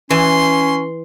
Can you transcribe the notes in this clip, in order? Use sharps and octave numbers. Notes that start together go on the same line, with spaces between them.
E3 C#4 C6